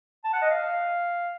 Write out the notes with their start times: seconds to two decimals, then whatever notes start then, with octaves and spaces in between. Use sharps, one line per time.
0.24 A5
0.33 F#5
0.41 D#5
0.50 F5